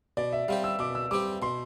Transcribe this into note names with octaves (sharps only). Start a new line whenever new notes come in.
B2 D5
E5
G3 C4 G4 F5
E6
B2 D6
E6
G3 C4 G4 D6
B2 C6